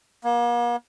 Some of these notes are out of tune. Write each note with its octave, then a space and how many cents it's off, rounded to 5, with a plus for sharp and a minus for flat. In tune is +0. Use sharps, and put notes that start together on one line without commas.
A#3 +40